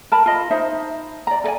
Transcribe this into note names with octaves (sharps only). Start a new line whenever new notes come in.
A#4 A5 B5
F4 D#5
D#4 C5 E5
D5 A#5
A4 D5 G#5